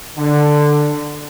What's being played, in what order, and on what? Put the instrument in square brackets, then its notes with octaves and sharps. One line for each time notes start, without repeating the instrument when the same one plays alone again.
[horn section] D3